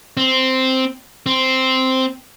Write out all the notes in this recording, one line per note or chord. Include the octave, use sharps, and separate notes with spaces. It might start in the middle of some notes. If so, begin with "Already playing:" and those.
C4
C4